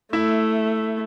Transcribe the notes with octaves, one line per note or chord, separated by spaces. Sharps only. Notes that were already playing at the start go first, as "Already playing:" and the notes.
A3 E4 E5